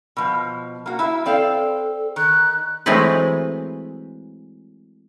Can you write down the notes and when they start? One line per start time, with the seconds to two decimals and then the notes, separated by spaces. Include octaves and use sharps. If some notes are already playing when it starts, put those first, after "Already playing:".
0.17 B2 F3
0.86 A#3 F#4
0.99 E4 E5
1.26 C4 A4 D5 F5
2.16 D#3 F#6
2.86 E3 F#3 G#3 A3 C4 B4